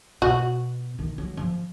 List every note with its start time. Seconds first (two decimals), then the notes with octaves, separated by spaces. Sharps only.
0.22 B2 F#4
0.99 D#3
1.18 F#3
1.37 F3